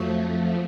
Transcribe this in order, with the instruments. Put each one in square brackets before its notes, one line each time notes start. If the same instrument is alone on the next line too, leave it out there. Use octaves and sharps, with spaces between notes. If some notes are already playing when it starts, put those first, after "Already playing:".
Already playing: [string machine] F2 F3 A3 [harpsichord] F#3